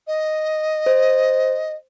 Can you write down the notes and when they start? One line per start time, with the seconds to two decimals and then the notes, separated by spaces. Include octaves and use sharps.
0.07 D#5
0.86 C5